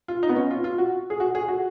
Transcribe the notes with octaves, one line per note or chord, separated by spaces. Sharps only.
F4
D#4
B3
C#4
F4
F4
F#4
G#4
F#4
G#4
F#4